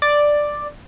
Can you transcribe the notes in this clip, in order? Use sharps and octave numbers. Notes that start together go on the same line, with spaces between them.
D5